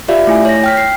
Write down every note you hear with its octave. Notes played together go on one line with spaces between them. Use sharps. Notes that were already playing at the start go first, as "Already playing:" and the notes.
F4 G4 D5 E5 F5
A3 E4 G#5
C#5 A#6
G5 F6 B6
C7